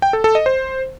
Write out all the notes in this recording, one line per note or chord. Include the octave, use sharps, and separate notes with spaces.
G5
A4
A4
D#5
C5